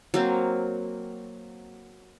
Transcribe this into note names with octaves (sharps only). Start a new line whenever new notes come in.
F#3 A#3 C4